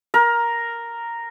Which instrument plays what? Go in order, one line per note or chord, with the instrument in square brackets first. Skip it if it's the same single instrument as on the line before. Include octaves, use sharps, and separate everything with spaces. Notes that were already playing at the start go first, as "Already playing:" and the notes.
[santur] A#4